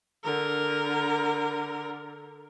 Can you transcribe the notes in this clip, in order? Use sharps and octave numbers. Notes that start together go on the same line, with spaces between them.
D3 A#4